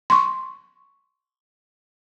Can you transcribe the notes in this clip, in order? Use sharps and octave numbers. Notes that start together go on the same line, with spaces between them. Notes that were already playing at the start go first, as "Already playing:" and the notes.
C6 C#6